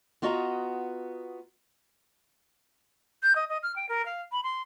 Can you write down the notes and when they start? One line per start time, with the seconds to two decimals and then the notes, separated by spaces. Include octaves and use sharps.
0.22 B3 F4 F#4 D#5 G#5 A#5
3.23 G6
3.36 D#5
3.49 D#5
3.63 F6
3.76 G5
3.89 A#4
4.06 F5
4.32 B5
4.44 C6